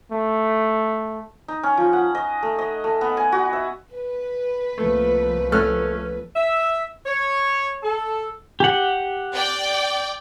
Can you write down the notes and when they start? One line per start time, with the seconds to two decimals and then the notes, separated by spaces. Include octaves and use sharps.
0.12 A3
1.48 D#4
1.63 C#4
1.77 F3
1.93 F#5
2.15 D#5
2.43 A3
2.59 D#5
2.84 A3
3.01 B3
3.17 G#5
3.32 F#4
3.53 E5
3.94 B4
4.78 C2 F3 A3 A#3
5.52 A3 C#4 F6 F#6
6.36 E5
7.06 C#5
7.83 A4
8.60 G4 F#5
9.34 D5 G5 D6